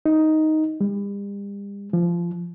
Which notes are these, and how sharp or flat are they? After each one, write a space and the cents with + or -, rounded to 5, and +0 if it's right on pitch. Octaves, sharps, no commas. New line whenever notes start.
D#4 +5
G3 +40
F3 -20